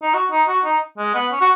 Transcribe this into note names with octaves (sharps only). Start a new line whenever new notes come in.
D#4
F#4
D#4
F#4
D#4
G#3
B3
C#4
F#4